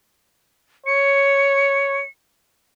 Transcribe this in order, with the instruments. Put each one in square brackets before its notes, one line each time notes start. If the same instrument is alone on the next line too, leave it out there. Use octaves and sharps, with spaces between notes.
[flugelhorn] C#5 [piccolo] C#7